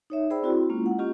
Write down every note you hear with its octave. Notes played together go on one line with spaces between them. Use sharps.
D#4 C#5 E5
G#4 C5 D5 G5 B5 E6
C4 E4 F#4
G#3 A#3 C#4 E4 F4
F#5
A#3 C#4 F4 G4 D#5